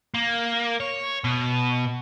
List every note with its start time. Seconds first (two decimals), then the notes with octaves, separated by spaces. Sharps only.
0.14 A#3
0.80 C#5
1.24 B2